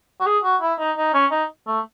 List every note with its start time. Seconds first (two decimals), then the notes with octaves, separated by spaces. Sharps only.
0.20 F#4
0.26 G#4
0.44 F#4
0.61 E4
0.79 D#4
0.97 D#4
1.14 C#4
1.31 D#4
1.67 A3